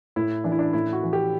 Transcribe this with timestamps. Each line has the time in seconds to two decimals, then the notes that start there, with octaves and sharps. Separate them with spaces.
0.16 A2 E4
0.44 E3 D4
0.52 E4
0.59 D4
0.73 A2 E4
0.93 F#4
1.04 E3
1.13 G4